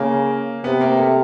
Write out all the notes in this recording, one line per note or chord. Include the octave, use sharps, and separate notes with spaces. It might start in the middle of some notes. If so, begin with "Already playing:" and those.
Already playing: C#3 A#3
C3 B3
A#3
A3